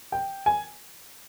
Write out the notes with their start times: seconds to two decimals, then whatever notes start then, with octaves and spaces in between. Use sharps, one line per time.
0.12 G5
0.46 G#5